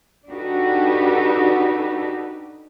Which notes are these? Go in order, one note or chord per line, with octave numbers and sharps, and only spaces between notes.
D4 D#4 F#4 G4 A4 B4